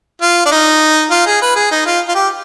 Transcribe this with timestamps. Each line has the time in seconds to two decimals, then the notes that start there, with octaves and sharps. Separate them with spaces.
0.22 F4
0.46 D4
0.51 D#4
1.11 F4
1.27 G#4
1.42 B4
1.56 G#4
1.71 D#4
1.86 F4
2.08 F4
2.15 G4